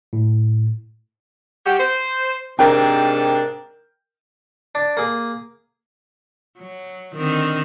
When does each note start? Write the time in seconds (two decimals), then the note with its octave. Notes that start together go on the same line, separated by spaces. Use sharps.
0.13 A2
1.65 F#4 G4
1.80 C5
2.59 G#2 C3 D4 A#4 G5
4.75 D4
4.97 A#3 G#4
6.59 F#3
7.15 D3 D#3 C4